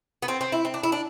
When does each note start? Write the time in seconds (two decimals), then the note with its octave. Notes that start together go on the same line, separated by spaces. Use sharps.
0.22 B3
0.28 C4
0.41 C4
0.52 E4
0.65 C4
0.74 D4
0.83 E4
0.92 D4